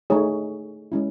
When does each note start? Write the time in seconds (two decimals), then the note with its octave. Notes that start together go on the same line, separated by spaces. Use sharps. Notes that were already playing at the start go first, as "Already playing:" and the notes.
0.10 A3 D#4 G#4 C#5
0.92 G#3 C#4 E4